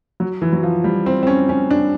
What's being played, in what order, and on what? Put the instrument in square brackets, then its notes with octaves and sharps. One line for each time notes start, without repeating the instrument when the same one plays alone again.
[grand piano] F#3
E3
F#3
F3
G3
C4
C4
C#4
C#4
D4